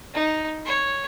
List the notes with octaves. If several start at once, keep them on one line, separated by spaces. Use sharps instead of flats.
D#4
C#5